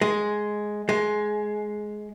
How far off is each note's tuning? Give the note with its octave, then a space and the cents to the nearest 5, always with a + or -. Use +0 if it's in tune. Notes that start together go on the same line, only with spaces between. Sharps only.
G#3 +5
G#3 +15